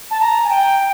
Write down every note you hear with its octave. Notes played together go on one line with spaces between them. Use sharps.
A5
A#5
G#5
G5